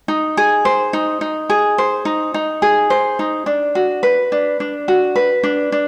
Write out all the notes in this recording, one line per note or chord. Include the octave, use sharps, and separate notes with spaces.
D#4
G#4
C5
D#4
D#4
G#4
C5
D#4
D#4
G#4
C5
D#4
D4
F#4
B4
D4
D4
F#4
B4
D4
D4